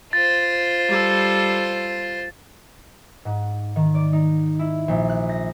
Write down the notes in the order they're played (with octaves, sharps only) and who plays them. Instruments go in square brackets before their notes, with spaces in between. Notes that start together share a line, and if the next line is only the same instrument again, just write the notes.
[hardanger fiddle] F4 C5 [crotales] A6
[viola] G3 A4
[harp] G#2
D#3
D5
D#4
E4
A#1
F#6
A#6